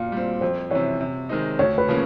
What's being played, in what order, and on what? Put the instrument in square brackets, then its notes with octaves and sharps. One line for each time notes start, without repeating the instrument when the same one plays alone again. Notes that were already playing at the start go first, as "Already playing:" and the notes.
Already playing: [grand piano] A#2 [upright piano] F5
[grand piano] G3 C4
[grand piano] F2 [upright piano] C5
[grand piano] C3 E3 [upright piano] C#5
[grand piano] C3
D#3 G#3 C4 D#4
[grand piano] D2 [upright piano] C#5
[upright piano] B4
[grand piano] C#3 F3 A#3 C#4